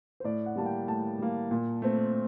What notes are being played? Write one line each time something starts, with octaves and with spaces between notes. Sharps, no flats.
C5
A2 D5
F#5
G3 A#3 A5
G5
A2 A5
G3 A#3
A#2
A3 C4